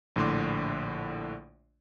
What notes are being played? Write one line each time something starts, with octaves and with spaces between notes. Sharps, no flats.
A#1 A2 D3 C6 D6